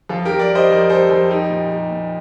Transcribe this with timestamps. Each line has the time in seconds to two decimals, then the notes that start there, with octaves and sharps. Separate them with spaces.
0.09 F2 F4 A4
0.25 G4 A#4
0.30 F2
0.39 A#4 D5
0.49 G3
0.55 C5 D#5
0.70 F2 A#4 D5
0.90 G3 A4 C5
1.10 F2 A4 C5
1.30 G3 D#4 G4
1.50 A#2
1.70 G3
1.91 A#2